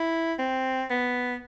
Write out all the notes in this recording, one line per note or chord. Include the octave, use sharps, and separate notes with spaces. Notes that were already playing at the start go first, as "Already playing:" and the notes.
Already playing: E4
C4
B3